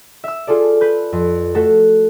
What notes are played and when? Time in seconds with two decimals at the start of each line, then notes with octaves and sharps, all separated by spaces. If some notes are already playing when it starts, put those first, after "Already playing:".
0.24 E5 E6
0.47 F4 G#4 A4 D5
0.81 B4 G6
1.13 F2
1.55 A3 F#4 A4